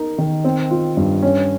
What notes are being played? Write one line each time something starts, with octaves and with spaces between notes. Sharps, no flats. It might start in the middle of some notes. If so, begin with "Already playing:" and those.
Already playing: D#4 A#4
D#3
C4
F4
G2
C#4